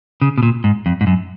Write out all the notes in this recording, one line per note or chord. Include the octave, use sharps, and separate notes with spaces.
C#3
B2
A#2
G#2
F2
G#2
F#2